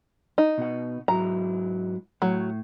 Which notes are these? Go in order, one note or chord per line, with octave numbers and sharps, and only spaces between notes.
D#4
B2 F#5
G#2 F#3 E4 A#5
A2 F#3